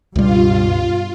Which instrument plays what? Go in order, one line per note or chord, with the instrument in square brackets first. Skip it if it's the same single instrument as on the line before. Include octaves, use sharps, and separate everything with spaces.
[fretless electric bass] C#2 G3 [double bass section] G2 B2 [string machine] F4